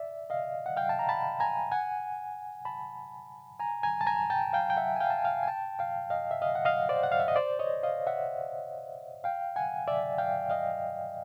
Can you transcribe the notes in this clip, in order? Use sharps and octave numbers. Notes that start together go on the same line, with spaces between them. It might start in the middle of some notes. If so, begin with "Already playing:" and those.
Already playing: D5 E5
D#5 F5
F#5
F5 G5
A5
A#5
A5 B5
G#5 A#5
F#5 G#5
A5 B5
G#5 A#5
G#5 A#5
A5
G#5 A#5
G5 A5
F5 G5
G5
E5 F#5
G#5
F5 G5
A5
G#5
F5 G5
G#5
G5 A5
F5 G5
D#5 F5
E5
D#5 F5
F#5
D#5 F5
C5 D5
F#5
F5
E5
D#5
C5 D5
C#5 D#5
D#5 F5
E5 F#5
F5 G5
F#5 G#5
D5 E5
F5 G5
D#5 F5